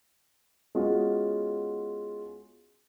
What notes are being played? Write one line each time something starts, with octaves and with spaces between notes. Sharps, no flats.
G#3 B3 C#4 F4 F#4 G#4